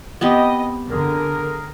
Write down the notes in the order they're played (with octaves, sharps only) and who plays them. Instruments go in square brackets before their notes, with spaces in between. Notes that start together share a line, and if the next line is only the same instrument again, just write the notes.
[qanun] B3 C4 G4 [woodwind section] D#5
[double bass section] D3 [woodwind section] G#4 A#4